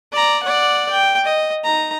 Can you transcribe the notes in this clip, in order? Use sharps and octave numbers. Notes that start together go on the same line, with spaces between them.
D5 A#5
D5 F#5
G5
D#5
D#4 A#5